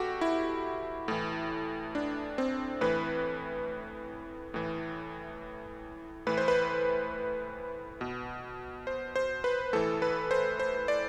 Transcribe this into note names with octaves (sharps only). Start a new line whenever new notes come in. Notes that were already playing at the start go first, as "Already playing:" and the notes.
Already playing: B2 F#4 G4 A4
E4
A2 E3
D4
C4
A2 E3 B4
A2 E3
A2 E3 B4
C5
B4
B2
C5
C5
B4
A2 E3 A4
B4
C5
C5
D5